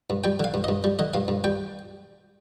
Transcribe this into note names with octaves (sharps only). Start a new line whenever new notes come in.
G2
G3 G5
D3 F5
G2
G2 D#5
G3
D3 D#5
G2 F5
G2
G3 G5